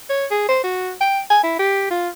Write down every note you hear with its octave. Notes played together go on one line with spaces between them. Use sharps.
C#5
G#4
C5
F#4
G5
G#5
E4
G4
F4